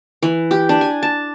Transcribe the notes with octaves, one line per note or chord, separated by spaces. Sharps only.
E3
G4
D4
G#5
A5